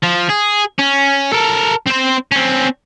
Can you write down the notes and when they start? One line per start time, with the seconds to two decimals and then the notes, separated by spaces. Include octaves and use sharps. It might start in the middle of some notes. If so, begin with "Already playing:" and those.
0.03 F3
0.29 G#4
0.79 C#4
1.33 A4 A#4
1.87 C4 C5
2.32 C4 C#4